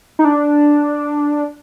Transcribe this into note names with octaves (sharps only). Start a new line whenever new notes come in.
D#4
D4